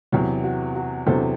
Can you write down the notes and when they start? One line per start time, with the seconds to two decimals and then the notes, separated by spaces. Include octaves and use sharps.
0.12 E2 C3 F#3
0.44 F#4
0.75 F#4
1.06 E2 C3 F#3 A4 C5